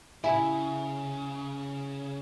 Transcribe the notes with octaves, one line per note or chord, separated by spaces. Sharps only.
C#3 E4 G#5